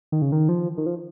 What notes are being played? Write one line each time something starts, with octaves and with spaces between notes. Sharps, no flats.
D#3
C#3
D#3
F3
D#3
F3